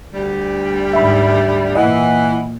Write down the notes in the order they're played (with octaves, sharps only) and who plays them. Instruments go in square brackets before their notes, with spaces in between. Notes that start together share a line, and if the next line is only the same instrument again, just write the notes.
[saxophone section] D2 G3
[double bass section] G#2 D#3 [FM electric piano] E5 B5
[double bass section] A#2 [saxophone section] E3 [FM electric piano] D#5 F#5